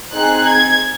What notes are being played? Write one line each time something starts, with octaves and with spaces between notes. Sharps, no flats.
C4 D#4 G#4 F#6
G#6